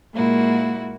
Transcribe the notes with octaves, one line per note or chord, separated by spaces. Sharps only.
A#2 G#3 A#3 E4 F#4